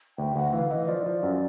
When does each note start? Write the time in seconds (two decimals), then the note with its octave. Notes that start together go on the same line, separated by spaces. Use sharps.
0.18 D2 G5
0.36 D2 F#5
0.53 E3 F5
0.70 E3 D#5
0.88 F3 D5
1.06 F3
1.23 F#2